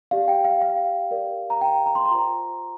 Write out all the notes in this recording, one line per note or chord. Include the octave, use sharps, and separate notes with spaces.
G4 D5 F5
G5
F5
F5
G4 A#4 D5
A#5
G5
A#5
C6
A#5
F4 C5